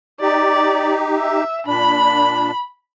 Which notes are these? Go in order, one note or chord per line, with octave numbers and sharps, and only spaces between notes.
D#4 G4 D5
E5
A#2 D4 B5